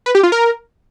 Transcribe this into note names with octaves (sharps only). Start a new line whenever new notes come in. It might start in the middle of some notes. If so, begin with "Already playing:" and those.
B4
G4
F4
A#4